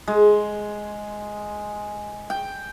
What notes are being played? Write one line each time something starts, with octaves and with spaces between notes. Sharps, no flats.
G#3
G5